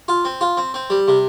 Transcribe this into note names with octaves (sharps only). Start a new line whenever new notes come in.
F4
C4
F4
C4
C4
G3
C3